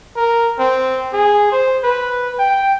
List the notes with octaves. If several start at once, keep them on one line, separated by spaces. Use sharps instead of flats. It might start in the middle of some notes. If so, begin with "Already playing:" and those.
A#4
C4
G#4
C5
B4
G5